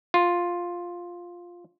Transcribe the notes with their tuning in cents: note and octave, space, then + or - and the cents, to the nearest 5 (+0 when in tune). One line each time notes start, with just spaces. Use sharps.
F4 +5